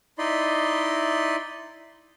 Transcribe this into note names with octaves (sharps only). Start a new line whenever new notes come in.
D#4 E4 D5 D#5 B5 C6